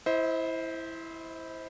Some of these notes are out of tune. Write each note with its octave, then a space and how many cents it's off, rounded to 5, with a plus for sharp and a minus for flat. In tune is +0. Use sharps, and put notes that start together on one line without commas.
E4 +0 C5 +0 D#5 +45